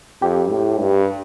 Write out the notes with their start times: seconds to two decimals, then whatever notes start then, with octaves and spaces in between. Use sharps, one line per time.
0.22 F2 G4
0.50 A2
0.79 G2